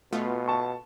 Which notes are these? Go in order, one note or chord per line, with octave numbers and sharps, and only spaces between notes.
B2 A3 B3 F4
A5 C#6